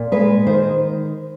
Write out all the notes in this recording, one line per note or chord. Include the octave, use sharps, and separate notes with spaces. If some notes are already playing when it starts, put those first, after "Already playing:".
Already playing: A#2
G#3 B4
D#3 C5